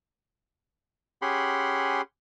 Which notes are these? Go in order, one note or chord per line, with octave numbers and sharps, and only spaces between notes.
C#4 G4 G#4 F#5 B5 C6